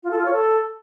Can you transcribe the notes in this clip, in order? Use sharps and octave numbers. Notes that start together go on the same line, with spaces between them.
F4
A4
F4
C#5
A4